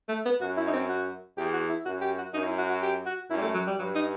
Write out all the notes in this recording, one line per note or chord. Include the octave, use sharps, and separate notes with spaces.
A3
B3
F#2 F#4
E4
D#4
C4
F#4
E2 G4
F#4
E4
F#2 F#4
G4
F#4
F#2 D#4
E4
F#4
F#4
G4
F#4
F#2 E4
G3
A3
F#3
G3
G2 F#3
D#4